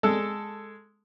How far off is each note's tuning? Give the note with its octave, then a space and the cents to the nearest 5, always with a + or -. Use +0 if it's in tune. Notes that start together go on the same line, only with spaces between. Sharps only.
G#3 +0 A4 +5